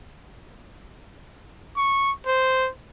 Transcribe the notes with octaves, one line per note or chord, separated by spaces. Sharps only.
C#6
C5